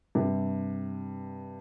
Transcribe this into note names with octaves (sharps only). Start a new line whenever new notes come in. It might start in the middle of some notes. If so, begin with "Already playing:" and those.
G2 C3